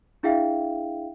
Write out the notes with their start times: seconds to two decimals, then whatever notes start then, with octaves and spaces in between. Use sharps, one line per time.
0.23 D4 E4 G#4 E5 F5 G5